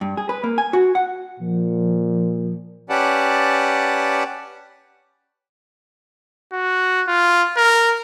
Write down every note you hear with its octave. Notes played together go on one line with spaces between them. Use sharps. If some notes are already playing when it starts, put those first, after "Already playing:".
G2
G#4
B4
A#3
G#5
F#4
F#5
A#2 F3
C#4 G4 B4 D5 F#5 A5
F#4
F4
A#4